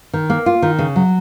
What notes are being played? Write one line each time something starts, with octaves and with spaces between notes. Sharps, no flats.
D#3
A#3
F4
D#3
C#3
F#3